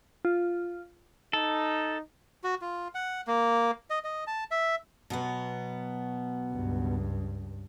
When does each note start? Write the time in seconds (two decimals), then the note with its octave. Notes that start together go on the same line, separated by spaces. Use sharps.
0.25 F4
1.33 D#4 A4
2.44 F#4
2.61 F4
2.95 F#5
3.27 A#3
3.90 D#5
4.04 D#5
4.27 A5
4.51 E5
5.10 B2 F#3 B3
6.52 C#2 G2